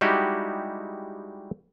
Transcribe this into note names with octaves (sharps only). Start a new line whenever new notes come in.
G3 G#3 D#4 E4 F#4 G4